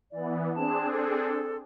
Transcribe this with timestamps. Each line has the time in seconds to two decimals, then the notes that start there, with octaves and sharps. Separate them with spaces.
0.12 E3 B3 D5
0.55 C4 D4 G#4 A5
0.92 A4